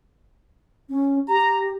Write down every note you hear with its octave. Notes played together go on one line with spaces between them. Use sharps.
C#4
G4 A#5